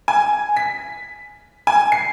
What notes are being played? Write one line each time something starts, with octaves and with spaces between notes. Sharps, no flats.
G#5
B6
G#5
C7